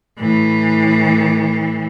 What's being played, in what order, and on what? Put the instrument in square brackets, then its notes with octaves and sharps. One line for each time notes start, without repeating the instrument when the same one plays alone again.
[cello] A2 E3